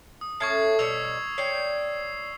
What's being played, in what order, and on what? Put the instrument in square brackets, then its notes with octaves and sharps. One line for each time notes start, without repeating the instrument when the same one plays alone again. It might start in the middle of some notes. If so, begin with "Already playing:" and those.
[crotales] D#6
[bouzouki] A2 C#4 A5 [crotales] C#6 G#6 C7
[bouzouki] B2 G3 C#5 [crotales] E6 C7 F7
[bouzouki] C#5 D5 G5 [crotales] C7